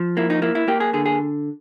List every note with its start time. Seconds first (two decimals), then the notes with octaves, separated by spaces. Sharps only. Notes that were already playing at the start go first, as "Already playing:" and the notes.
Already playing: F3
0.17 A#3 E4
0.30 D#4
0.42 A#3 E4
0.55 E4
0.68 A#3 G4
0.80 G#4
0.93 D3 G#4
1.06 G#4